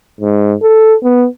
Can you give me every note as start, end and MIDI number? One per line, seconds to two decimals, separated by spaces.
0.21 0.54 44
0.63 0.95 69
1.04 1.26 59